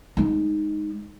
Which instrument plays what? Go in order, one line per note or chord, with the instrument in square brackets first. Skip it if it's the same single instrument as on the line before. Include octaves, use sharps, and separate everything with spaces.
[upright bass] G#3 D#4